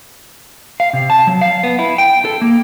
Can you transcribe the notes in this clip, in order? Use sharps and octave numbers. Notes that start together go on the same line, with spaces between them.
F5
C3
A5
F#3
F5
B3
E4
G5
A4
A#3